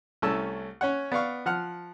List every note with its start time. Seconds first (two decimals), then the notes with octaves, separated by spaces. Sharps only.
0.22 C2 A3 C#4 A5 E6
0.81 C#4 C#5 F#5
1.12 B3 D5 F5 C#6
1.46 F3 F#5 F6